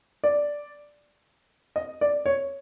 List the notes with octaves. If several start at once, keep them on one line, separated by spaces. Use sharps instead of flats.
D5
D#5
D5
C#5